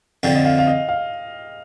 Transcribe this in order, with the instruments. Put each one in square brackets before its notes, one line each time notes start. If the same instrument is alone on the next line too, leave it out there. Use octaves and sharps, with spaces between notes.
[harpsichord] F2 D3 F3 [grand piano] G5
[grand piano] D#5
F5
F5
D#5
F5